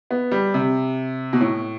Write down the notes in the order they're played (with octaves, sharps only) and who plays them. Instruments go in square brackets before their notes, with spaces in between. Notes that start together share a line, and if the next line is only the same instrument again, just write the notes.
[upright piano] B3
G3
C3
B2
A2